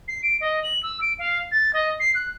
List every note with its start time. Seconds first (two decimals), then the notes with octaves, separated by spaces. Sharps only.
0.08 C7
0.23 D7
0.41 D#5
0.63 F#7
0.83 E6
1.01 D7
1.19 F5
1.51 A6
1.73 D#5
2.00 C7
2.15 F#6